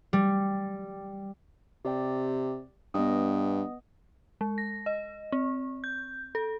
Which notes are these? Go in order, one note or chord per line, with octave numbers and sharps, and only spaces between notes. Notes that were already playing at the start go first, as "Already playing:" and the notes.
G3
C3 G4 D5 G5
G2 B3 D#5 D#6
G#3
A#6
D#5
C4
G6
A4